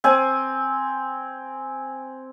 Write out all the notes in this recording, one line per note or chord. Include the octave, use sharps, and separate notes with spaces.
C4 G#5